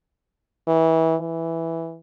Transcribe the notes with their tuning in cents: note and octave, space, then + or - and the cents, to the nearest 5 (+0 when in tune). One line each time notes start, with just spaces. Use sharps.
E3 -25
E3 +0